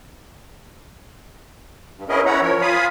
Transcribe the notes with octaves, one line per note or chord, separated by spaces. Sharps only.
G2
B3 C#4 E4 G#4 A#4 D#5
C#4 E4 C#5 F#5 A#5
F3 A#4 C#5
F4 F5 G#5 B5 D#6